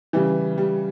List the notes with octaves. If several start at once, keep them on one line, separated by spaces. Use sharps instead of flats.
C#3 E3 G3
G3